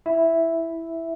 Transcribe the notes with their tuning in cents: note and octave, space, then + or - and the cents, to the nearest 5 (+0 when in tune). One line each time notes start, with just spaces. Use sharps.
E4 +0 E5 +0